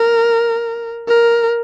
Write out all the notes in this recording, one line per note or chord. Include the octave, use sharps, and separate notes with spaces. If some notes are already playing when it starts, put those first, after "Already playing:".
Already playing: A#4
A#4